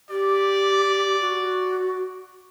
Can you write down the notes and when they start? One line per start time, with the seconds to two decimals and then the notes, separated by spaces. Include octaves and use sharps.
0.10 G4 D5
1.21 F#4